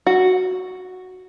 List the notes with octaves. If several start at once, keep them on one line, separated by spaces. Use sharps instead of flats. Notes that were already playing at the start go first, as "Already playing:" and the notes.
F#4